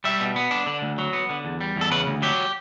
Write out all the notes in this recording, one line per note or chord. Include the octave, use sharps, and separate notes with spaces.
G3 E5
B2
B3
D4
D3
D2
F#3
B3
D3
E2
G3
E2 A4
C#3 B4
D2
F#3 G4